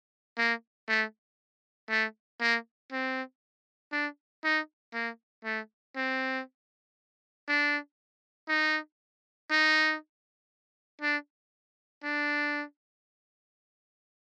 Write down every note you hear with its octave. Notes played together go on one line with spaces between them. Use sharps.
A#3
A3
A3
A#3
C4
D4
D#4
A#3
A3
C4
D4
D#4
D#4
D4
D4